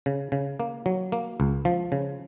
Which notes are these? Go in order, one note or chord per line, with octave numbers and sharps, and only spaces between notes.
C#3
C#3
A#3
F#3
A#3
C#2
F3
C#3